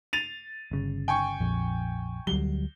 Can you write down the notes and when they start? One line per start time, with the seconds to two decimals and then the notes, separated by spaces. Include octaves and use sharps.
0.13 A6 D#7 F7
0.71 G1 C#3
1.08 G5 G#5 C#6
1.40 A#1 F2
2.27 D2 F#3 G3 G7